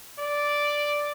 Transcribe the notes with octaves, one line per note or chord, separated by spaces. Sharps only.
D5